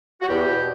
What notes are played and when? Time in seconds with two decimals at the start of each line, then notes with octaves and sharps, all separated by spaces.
0.22 F#4
0.29 E2 G4
0.47 B2